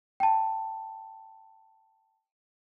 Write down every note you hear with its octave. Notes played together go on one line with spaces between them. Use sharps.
G5 A5